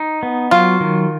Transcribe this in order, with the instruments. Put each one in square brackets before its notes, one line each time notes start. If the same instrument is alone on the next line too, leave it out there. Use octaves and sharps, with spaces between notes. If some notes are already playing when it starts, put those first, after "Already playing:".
Already playing: [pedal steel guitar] D#4
B3
[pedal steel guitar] F#3 [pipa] F4
[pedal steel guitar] D#3